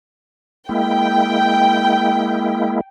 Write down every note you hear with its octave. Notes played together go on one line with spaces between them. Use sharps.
G#3 A#3 E4 G5